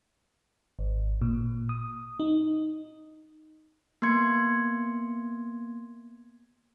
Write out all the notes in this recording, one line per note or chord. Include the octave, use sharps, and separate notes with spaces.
G#1
A#2
D#6
D#4
A#3 B3 C6 G#6 C#7